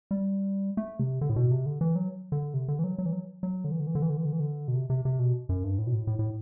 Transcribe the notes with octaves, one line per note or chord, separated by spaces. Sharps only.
G3
A3
C3
D3
A2
B2
C3
D3
E3
F#3
D3
C3
D3
E3
F#3
F#3
E3
F#3
F#3
D3
E3
D3
E3
D3
E3
D3
E3
D3
E3
D3
B2
C3
C3
C3
B2
F#2
G2
A2
B2
A2
A2
A2